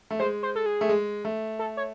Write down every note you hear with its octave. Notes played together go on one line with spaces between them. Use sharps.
A3
G#3 C5
C5
A4
G#4
A3
G#3
A3
A4
C#5